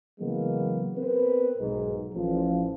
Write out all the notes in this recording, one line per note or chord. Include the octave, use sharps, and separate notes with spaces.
C#3 E3 F#3 G#3 A#3 B3
B3 C4 A#4 B4
B1 G#2
A1 F3